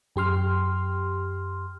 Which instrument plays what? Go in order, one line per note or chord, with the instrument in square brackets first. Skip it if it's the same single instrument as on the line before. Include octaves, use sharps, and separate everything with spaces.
[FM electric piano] F#2 G4 C6 F6